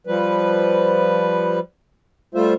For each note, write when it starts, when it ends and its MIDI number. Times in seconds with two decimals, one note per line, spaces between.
0.07 1.59 53
0.07 1.59 55
0.07 1.59 71
2.35 2.54 55
2.35 2.54 57
2.35 2.54 65
2.35 2.54 72
2.35 2.54 76